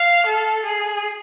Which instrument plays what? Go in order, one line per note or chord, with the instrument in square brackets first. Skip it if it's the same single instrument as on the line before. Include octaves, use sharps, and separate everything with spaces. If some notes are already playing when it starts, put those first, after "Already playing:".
Already playing: [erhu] F5
A4
G#4